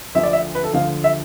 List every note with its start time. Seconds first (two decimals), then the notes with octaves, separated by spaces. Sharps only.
0.15 D2 D3 F3 E5
0.23 D5
0.33 E5
0.55 B4
0.64 A4
0.74 D2 D3 F3 F5
1.04 E5